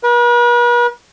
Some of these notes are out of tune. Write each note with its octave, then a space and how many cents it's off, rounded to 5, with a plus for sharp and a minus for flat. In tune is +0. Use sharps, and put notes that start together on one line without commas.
B4 -45